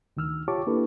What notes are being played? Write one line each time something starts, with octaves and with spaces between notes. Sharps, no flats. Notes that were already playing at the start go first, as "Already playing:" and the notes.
D2 D#3 E6 F6
F4 G4 C#5 A5 C#6 D6
A#3 D4 E4 G4 A4 B4